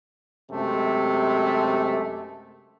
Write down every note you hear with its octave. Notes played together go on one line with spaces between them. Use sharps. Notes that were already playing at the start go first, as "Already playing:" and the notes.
F#2 C3 G#3 A3